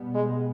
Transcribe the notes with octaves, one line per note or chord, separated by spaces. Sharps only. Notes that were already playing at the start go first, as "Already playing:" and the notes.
Already playing: B2 G3 B3
G#3